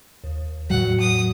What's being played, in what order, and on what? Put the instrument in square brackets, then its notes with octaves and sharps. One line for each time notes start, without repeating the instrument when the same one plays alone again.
[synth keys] D#2
[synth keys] E2 A2 [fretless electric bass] F#3 [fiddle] F#5
[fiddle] D#6